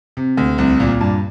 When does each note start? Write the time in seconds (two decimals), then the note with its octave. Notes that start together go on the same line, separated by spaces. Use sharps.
0.17 C3
0.37 D2
0.58 C2
0.80 A#2
1.01 G2